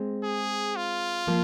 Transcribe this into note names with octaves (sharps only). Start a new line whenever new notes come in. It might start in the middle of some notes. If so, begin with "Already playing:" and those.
Already playing: G#3 C4
G#4
F4
F3 A#3